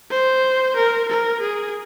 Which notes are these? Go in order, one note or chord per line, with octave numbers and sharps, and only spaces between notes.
C5
A#4
A#4
G#4